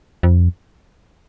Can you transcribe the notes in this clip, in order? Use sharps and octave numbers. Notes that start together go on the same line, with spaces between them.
F2